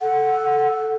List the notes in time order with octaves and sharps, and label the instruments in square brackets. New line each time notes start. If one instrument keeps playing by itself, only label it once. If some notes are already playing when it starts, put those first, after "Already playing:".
[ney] A4 [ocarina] F#5